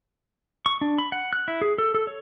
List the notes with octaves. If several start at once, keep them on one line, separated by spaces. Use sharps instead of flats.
C#6
D4
B5
F#5
F#6
E4
G#4
A4
A4
C#5